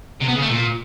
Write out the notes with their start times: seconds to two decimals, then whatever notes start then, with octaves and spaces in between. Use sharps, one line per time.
0.21 C3
0.28 B3
0.35 C#3
0.42 A3
0.49 A#2